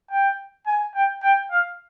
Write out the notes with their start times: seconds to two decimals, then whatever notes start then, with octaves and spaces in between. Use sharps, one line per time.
0.10 G5
0.66 G#5
0.94 G5
1.22 G5
1.50 F5